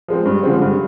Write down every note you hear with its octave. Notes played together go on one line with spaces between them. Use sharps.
F3 G#3 C4
G2
D3 F3 G#3 C4
G2